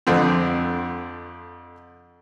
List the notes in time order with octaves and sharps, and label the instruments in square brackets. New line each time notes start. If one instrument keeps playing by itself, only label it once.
[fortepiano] F2 D3 C4